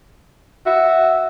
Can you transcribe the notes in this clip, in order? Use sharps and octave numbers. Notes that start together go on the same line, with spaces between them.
F#4 E5